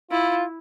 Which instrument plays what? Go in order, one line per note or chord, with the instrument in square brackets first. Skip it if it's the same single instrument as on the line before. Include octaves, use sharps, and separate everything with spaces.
[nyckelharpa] E4 [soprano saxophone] F4